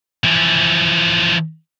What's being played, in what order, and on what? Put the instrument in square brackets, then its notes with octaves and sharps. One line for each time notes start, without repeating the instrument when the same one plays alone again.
[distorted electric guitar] E3 F3